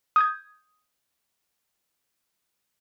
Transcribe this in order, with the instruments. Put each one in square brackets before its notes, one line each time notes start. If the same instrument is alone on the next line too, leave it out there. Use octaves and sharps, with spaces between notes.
[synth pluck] D#6 G6 G#6